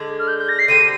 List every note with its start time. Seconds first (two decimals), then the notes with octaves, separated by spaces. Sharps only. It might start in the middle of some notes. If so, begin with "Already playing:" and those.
Already playing: D3 G#3 D4
0.19 F6
0.28 G6
0.38 G6
0.49 A#6
0.59 C7
0.68 D3 G3 C4 G4 D#7